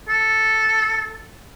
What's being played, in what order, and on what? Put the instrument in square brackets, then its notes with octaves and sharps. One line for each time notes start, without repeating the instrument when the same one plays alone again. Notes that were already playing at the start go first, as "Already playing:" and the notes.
[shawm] A4